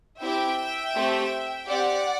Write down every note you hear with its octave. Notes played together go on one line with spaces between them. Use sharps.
C4 E4 G4 E5 G5
A3 C4 G4
C4 G4 D5 F#5